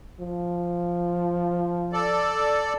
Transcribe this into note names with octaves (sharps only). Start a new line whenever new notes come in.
F3
A4 D5